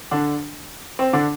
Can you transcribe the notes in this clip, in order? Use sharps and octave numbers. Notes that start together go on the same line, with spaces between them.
D3 D4
C4
D3 D4